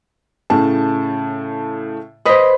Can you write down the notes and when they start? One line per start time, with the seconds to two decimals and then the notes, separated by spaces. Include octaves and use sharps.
0.50 A2 C#3 A5
2.25 B4 C5 D#5 D#6 B6